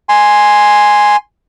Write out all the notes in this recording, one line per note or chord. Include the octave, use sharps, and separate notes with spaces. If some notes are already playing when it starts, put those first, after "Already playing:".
G#5 C6